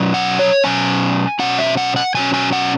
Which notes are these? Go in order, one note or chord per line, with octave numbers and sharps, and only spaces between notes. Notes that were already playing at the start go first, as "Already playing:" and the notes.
Already playing: B2 F#3 C#4
F#5
C#5
B2 F#3 C#4 G#5
B2 F#3 C#4 F#5
E5
F#5
F#5
B2 F#3 C#4 G#5
G#5
F#5